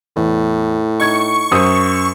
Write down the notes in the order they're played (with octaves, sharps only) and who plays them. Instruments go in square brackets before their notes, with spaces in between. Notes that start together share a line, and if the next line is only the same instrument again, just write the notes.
[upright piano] E2 [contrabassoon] A2
[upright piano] D#4 G#6 [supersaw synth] C#6
[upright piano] F#2 C5 D#6